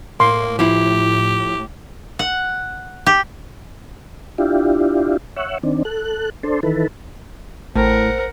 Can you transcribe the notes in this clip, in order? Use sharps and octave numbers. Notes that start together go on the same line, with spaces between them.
A2 A#3 C6
F3 E4 G4
F#5
G4
D4 E4 F4 G4
C#5 E5 F#5
D#3 C4 D4
A4 F#6
D4 A4 C5
D#3 E3 A4 B4
A1 A2 A#4 C5 F#5